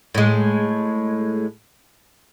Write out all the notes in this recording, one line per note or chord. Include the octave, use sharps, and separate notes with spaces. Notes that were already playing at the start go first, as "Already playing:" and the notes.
A2 G#3